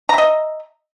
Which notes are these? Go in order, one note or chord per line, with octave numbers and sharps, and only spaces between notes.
D#5 E5 A#5